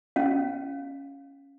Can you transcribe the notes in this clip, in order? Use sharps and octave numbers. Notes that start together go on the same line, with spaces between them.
C#4 F5